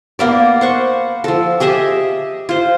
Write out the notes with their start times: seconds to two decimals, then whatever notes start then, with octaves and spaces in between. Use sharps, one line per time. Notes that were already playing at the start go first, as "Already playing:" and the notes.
0.19 A#3 B3 D5
0.61 C5 F#5 C#6
1.24 F3 A4
1.60 G4 G#4 D#5 E5
2.49 F4 C5